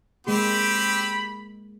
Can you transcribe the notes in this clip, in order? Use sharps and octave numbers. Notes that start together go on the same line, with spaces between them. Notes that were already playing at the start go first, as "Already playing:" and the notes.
G#3 A#3 C4 G4 G#4 B5